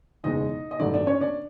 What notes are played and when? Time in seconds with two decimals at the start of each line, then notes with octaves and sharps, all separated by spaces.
0.24 F#1 E2 B2 G#3 D#4 D#5
0.71 D#5
0.79 A1 G2 D#3 F#3 A3 D4 D5
0.94 D4 D5
1.06 C#4 C#5
1.21 D4 D5